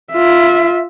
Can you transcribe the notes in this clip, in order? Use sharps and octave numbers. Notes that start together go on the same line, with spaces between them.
F4 E5